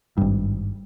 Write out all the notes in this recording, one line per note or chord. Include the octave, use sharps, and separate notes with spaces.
G#1 G2